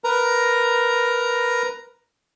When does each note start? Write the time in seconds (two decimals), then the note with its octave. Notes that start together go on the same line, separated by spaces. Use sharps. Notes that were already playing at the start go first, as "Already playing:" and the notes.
0.04 A#4 B4 A#5